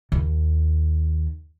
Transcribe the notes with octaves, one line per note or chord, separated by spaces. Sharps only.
D#2